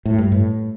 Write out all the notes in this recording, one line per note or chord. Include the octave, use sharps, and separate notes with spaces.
A2
G2
A2